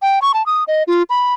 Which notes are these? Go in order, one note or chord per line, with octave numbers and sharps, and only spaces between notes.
G5
C#6
A5
D#6
D#5
F4
B5